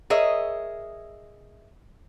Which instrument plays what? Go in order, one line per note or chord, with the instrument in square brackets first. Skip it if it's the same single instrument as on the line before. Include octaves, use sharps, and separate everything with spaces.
[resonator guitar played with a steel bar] G#4 A#4 C#5 D#5 E5